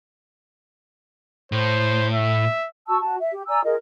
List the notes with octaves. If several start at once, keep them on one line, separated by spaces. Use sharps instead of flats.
A2 C5
E5
F#4 A5 C#6 E6
F#4 A5
E5
G4
D5 G#5 A#5 E6
F4 G#4 A#4 D#5